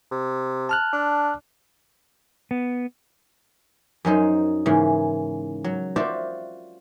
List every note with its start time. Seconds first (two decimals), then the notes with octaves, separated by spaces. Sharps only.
0.11 C3
0.69 A5 F6 F#6
0.93 D4
2.51 B3
4.05 F#2 F#3 D#4 C5
4.66 G#2 C#3 E3 A#3
5.64 F#3
5.96 F4 F#4 C5 D5 E5 F5